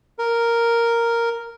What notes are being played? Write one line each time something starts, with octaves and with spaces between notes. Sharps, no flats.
A#4